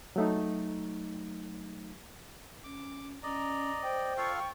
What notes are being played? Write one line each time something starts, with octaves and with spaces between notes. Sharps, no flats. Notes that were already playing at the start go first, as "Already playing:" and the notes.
F#3 A3 D#4
C#4 D6
C#4 D5 D#5 A#5
C5 G5
F4 A4 F5 C#6